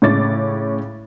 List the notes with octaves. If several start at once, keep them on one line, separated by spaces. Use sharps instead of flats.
A2 C#3 C#5 D6 A6